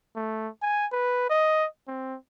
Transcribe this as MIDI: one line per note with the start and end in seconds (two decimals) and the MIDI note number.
0.16 0.49 57
0.62 0.87 80
0.92 1.27 71
1.30 1.66 75
1.88 2.17 60